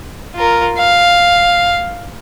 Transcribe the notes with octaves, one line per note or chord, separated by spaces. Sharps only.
F4 A#4
F5